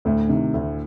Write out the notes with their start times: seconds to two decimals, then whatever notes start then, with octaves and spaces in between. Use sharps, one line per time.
0.05 D2 A2
0.29 C3 D#3
0.54 D2